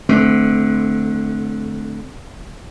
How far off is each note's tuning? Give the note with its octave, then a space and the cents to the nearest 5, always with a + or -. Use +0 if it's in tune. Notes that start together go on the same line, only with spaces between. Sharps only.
D3 +0 A3 -30 C4 -25